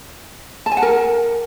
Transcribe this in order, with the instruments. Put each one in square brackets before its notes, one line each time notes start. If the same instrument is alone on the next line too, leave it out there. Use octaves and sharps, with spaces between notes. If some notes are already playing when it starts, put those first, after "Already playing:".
[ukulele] A5
G#5
F#5
A#4